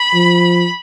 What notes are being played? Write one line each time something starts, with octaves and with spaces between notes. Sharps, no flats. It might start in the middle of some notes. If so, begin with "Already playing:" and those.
Already playing: B5
F3